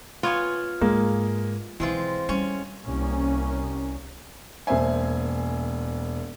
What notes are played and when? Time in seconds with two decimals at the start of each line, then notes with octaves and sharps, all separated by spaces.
0.23 B3 F4 C#5 G#5
0.81 G#2 G#3 A#3
1.80 B1 E3 G#3 C4 C#4 F4
2.29 G3 C#4
2.84 C2 A#3 C#4
4.67 E1 A#3 C5 E5 G#5